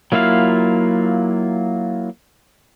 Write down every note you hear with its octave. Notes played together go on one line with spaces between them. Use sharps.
F#3 A#3 E4 F4 F5